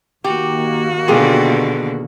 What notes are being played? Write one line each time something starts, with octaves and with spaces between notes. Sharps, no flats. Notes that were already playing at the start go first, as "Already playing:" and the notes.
D#3 A#3 F#4 G4
B2 D3 F4 G4 G#4